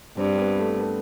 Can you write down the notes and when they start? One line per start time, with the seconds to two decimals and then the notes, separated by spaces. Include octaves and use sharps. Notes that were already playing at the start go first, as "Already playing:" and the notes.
0.17 G2 C4
0.38 B3
0.58 A3
0.78 B3